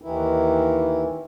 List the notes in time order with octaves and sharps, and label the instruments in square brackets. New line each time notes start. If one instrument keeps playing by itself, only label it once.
[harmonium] D#2 D#3 E3 E4